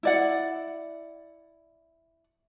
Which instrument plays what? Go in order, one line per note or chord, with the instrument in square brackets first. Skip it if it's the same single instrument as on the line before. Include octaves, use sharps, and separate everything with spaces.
[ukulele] E4 D5 F#5